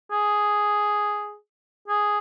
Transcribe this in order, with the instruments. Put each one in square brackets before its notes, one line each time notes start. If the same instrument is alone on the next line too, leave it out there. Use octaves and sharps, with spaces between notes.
[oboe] G#4
G#4